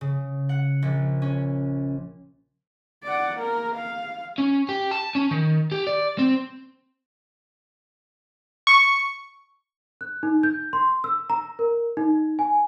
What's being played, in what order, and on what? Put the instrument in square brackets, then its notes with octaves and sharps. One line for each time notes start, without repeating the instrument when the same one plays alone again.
[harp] C#3
F#5
A#1
C#4
[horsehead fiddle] D5 F#5
A#3 A#4
F5
[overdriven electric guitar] C#4
G4
A5
C#4
D#3
G4
D5
C4
[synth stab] C#6
[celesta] F#6
D#4
G6
C6
E6
A#5
A#4
D#4
G#5